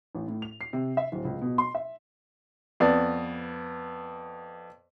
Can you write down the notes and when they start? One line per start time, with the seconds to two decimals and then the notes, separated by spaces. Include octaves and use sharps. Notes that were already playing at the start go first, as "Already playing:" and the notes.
0.15 A1
0.28 A2
0.42 F7
0.61 C7
0.73 C3
0.97 E5
1.12 D1
1.25 C#2
1.42 B2
1.58 C6
1.75 E5
2.80 F2 B3 D5